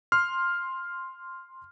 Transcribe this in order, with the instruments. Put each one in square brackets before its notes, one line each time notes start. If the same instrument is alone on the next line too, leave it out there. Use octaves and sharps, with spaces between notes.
[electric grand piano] C6 F6 C7